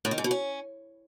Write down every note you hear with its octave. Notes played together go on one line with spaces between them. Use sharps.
A2
D#3
G#2
B2
C#4